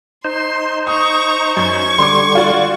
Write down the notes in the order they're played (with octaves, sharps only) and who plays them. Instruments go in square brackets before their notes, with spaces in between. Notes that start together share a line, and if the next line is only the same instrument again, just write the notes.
[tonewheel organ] D#4 C5 [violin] C6
[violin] A#5 C#6 [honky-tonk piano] D#6
[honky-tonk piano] F#2 [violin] C#6 G#6
[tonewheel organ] D3 G3 [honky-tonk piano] C6 D6
[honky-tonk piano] F4 F#4 D5